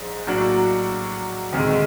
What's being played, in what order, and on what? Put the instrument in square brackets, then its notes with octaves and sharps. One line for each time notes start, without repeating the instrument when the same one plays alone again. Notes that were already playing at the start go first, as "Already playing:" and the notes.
Already playing: [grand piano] A#1 G#2
A2 F#3 A#3 D4 F#4
D2 C3 D#3 G#3